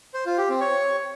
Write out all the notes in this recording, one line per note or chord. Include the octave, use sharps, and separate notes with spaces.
C5
F4
G4
C4
C#5